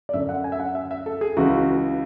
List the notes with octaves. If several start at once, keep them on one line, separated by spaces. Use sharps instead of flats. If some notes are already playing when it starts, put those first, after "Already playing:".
D5
F#2 D3 E5
F#5
G#5
E5
F#5
E5
E5
A4
G#4
C#2 C#3 E3 F#4